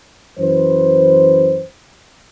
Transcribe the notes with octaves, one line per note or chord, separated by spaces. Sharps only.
F#2 E3 B4 C5